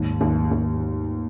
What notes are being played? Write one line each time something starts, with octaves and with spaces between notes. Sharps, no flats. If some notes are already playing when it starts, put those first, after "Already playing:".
Already playing: D#2 G#2
D#2
D#2